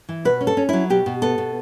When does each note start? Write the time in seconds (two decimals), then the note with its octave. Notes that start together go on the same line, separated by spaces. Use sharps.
0.09 E3
0.25 B2 B4
0.41 C#4
0.47 A4
0.57 C#4
0.69 F#3 E4
0.90 B2 G4
1.06 B2
1.22 B3 A4
1.38 B2